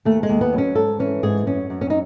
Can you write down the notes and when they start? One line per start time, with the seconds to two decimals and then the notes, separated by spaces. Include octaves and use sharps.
0.05 D#2 A3
0.23 G#3
0.29 D#2
0.41 B3
0.53 F#3
0.58 C#4
0.75 G#2 A4
0.99 E3 C#4
1.23 G#2 G#4
1.46 F#2 C#4
1.70 F#2
1.81 C#4
1.90 D#4